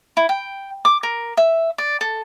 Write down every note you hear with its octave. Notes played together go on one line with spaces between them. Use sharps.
E4
G5
D6
A#4
E5
D5
A4